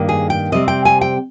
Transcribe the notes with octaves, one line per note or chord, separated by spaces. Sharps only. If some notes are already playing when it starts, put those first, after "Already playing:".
Already playing: G2 D#3 A#3
G#4
G5
C3 G3 C4 D#5
G5
G#5
G5